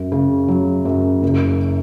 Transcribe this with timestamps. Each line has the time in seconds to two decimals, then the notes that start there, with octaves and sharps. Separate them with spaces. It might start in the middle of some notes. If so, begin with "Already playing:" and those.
Already playing: F#2
0.12 C#3
0.48 F#3
0.85 F#2
1.23 F#1